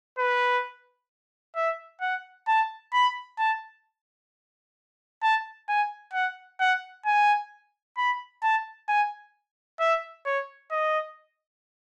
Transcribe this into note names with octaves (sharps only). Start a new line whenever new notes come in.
B4
E5
F#5
A5
B5
A5
A5
G#5
F#5
F#5
G#5
B5
A5
G#5
E5
C#5
D#5